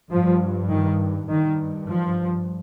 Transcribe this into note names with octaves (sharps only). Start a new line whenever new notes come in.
G2 F3
D#3
G2 D#3
F3